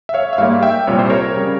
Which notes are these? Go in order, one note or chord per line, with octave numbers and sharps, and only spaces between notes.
E5
C#5 F5
E5
G#2 G3 A#3 C#5 F5
E5 G5
C2 A#2 G3 C4 C#5
C5
A#4 C#5
C#3 G3